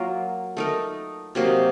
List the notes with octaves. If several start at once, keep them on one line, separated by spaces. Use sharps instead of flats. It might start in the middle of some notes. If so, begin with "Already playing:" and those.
Already playing: F#3 A#3 F4 A#4
A3 D#4 A#4
C3 F#3 A#3 D#4